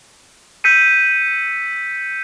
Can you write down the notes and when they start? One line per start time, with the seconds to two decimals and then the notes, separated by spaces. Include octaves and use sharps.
0.64 E6 G6 B6 C#7 D#7